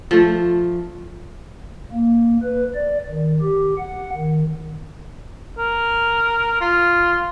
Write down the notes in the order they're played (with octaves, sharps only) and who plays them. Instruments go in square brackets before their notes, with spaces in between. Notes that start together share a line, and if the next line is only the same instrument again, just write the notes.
[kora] F3 A3
[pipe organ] A#3
B4
D5
D#3
G4
F#5
D#3
[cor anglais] A#4
F4